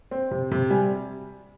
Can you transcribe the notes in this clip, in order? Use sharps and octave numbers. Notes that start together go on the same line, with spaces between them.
C4
C3
C3
G3 G#5